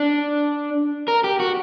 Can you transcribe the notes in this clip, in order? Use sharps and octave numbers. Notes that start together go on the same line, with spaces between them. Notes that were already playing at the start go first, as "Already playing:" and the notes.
Already playing: D4
A#4
G4
F#4